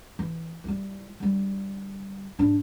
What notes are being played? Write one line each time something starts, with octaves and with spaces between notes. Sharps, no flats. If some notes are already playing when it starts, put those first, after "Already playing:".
E3
G3 E4
D3 G3
G#2 D4